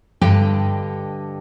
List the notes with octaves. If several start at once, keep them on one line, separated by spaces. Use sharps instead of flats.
G2 D3 G4 D#5 G5